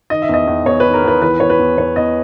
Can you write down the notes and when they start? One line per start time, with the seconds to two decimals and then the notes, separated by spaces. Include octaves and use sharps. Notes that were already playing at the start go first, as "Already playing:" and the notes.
0.10 D#3 D#5
0.22 E5
0.29 E2 D#5
0.47 E2
0.66 E2 C#5
0.80 B4
0.85 D#3
0.94 A#4
1.03 E2 B4
1.22 E3 B4
1.40 E2 C#5
1.50 B4
1.59 E2
1.77 E2 C#5
1.96 E2 D#5